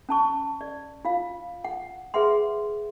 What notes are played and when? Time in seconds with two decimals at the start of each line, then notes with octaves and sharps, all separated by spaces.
0.09 C#4 A5 C#6
0.61 D5
1.05 F4 F5
1.65 F#5
2.14 G#4 B4 E5 F#5 C6